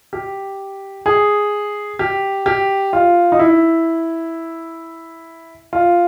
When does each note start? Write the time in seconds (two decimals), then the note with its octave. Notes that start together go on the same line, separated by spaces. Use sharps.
0.13 G4
1.06 G#4
1.99 G4
2.46 G4
2.93 F4
3.32 D#4
3.39 E4
5.73 F4